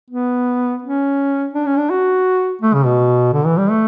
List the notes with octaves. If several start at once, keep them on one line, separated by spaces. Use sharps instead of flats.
B3
C#4
D4
C#4
D4
F#4
A3
C#3
B2
D3
E3
G3
A3